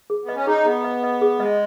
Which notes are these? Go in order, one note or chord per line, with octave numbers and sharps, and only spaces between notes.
G#4
B3 D#5
C#4
D#4 G#4
B3 G#4
D#5
D#5
G#4
G#3 D#5